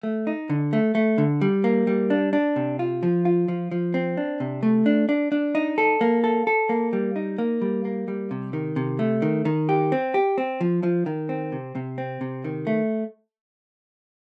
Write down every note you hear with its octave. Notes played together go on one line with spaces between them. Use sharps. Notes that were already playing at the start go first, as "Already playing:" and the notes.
A3
D#4
D3
A3
A3
D3
G3
A#3
G3
D4
D4
C3
F4
F3
F4
F3
F3
C4
D4
C3
A3
D4
D4
D4
D#4
A4
A#3
A4
A4
A#3
G3
D#4
A#3
G3
A#3
G3
C3
D#3
C3
A3
D#3
D#3
G4
C4
G4
C4
F3
F3
D#3
C4
C3
C3
C4
C3
D#3
A3